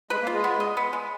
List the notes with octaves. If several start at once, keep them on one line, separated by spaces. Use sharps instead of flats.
G#3 B4
A#3
F4
G#3
B3
D#5
B3
G#3